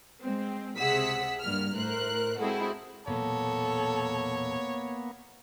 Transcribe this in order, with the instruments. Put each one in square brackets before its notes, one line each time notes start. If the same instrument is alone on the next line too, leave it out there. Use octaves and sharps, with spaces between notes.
[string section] G#3 C4
C#2 C3 G#4 F#5 E6 B6
G2 A#3 F6
A2 A#4 C5 F#6
G#3 C4 E4 F#4 G#4 A4
[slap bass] E1 A#2 F#3 [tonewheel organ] A#3 B3 [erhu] A4 [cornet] C#5